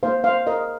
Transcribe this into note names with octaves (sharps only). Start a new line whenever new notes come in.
A#3 D#4 C5 F5
C5 F5
A#4 D#5